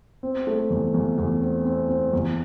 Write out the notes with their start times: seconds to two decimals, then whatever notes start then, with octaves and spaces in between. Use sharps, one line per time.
0.23 C4
0.47 A3
0.71 E2
0.94 E2
1.18 E2
1.42 C4
1.65 C4
1.89 C4
2.13 E2